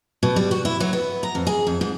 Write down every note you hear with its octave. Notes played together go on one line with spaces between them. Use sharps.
B2
G3
F#4
E4
F#3
B3
A#5
F2
G#4
F2
G#2